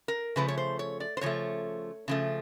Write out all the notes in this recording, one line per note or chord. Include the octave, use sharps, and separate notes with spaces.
A#4
C#3 F3 A3 B4
C#5
C5
C#5
D5
C5
C#3 F3 A3 C#5
C#3 F3 A3